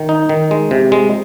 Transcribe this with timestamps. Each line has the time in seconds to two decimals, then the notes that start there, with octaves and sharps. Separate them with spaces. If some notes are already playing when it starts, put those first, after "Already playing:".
Already playing: D#3
0.09 D#4
0.29 D#3
0.51 G#3
0.71 C3
0.92 G#3